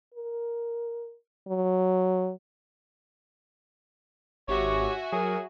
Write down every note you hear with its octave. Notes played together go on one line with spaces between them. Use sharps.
A#4
F#3
G#1 F#4 G4 C#5 E5 G#5
F#3 G#4 A#4